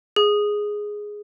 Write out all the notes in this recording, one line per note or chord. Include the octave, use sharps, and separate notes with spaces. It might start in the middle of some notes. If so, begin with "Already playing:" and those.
G#4